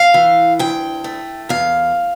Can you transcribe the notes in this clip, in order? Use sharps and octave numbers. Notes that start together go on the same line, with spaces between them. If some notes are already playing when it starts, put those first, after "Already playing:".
Already playing: F5
E3
D2 G5
A3
E2 F5